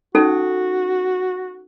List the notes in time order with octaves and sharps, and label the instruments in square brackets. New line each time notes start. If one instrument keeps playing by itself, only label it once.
[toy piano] C#4 D#4 A4 [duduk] F#4